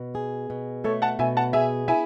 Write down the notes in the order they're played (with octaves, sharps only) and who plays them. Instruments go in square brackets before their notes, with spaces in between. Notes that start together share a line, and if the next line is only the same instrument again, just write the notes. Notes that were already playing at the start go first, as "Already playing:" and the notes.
Already playing: [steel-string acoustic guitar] B2
G#4
B2
[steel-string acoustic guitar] A3 [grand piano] A4 C#5
[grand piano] F#5 A5
[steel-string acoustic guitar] B2 [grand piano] E5 G#5
[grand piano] F#5 A5
[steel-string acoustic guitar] G#4 [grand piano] E5 G#5
[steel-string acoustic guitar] E4 [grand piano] E5 G#5